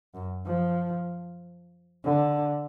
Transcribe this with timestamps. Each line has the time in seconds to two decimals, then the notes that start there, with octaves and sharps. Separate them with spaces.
0.15 F#2
0.46 F3
2.05 D3